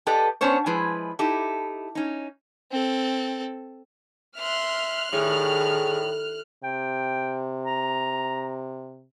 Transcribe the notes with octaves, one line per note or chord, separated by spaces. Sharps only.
G4 A4 B4 D5 D#5
B3 C#4 D4 C5 C#5
F3 G#3 E4 G#4 B4
D#4 E4 G4 A4
C#4 D#4
C4 A4
E5 C6 F6 F#6
A2 D#3 G3 G#4
C3 G5
A#5